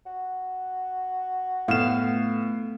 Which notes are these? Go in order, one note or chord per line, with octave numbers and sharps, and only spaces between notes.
F#4
A2 A3 B3 F5 E7